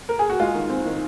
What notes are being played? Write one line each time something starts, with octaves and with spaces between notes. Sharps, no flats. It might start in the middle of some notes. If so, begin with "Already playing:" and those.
A#4
G#4
F#4
G#3 F4
D#3
C4
D#3